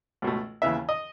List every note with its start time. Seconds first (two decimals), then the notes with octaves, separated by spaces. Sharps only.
0.22 C#2 B2 A3
0.62 D#2 C#3 E3 B3 E5
0.89 D#5